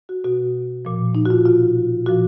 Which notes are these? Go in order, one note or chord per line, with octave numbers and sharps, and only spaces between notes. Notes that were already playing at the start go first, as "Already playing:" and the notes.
F#4
B2 F#4
A#2 F3
D#4
F#4
F4
B2 F4
A#2 F3 F#4